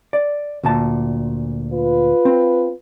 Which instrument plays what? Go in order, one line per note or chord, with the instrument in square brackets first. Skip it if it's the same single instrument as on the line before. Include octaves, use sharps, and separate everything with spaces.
[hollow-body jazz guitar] D5
D2 A#2 A5
[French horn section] F4 B4
[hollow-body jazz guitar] C4